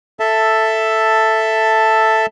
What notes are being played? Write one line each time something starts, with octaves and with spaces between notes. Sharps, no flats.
A4 E5 A5